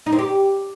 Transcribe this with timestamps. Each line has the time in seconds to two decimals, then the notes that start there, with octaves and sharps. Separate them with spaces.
0.06 D#4
0.12 C4
0.19 G4